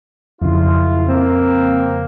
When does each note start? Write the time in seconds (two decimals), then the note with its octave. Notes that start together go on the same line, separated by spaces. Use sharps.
0.42 F#1 F2 C#3 E4 F4
1.08 A#3 C4